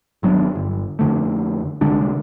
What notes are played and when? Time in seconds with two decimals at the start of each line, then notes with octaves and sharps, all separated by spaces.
0.23 G#1 F#3 B3 D4
0.55 G1
0.99 F2 D3 A3
1.81 C2 D3 G#3 D4